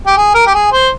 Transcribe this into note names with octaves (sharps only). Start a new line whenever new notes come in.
G4
G#4
A#4
G4
G#4
C5